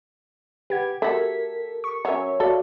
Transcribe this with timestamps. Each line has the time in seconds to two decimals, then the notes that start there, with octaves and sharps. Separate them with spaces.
0.70 G4 B4 F#5 G#6
1.02 A3 F#4 A4 A#4 B6
1.84 C#6
2.05 F#3 C#4 C#5 E5
2.40 F#4 A4 D5 F5